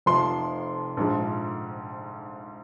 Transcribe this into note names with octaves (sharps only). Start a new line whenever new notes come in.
F1 F2 C3 F3 C6
A#1 G#2 F3 G#3